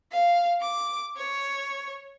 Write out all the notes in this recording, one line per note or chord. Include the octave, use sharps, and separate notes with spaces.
F5
D6
C#5